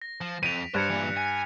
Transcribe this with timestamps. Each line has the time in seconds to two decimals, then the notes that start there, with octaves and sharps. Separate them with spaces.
0.02 A#6
0.21 F3
0.43 F2 B6 D7 D#7 F7
0.74 G2 C5 F#6 G#6 C#7
0.90 A#2 E3
1.17 G#5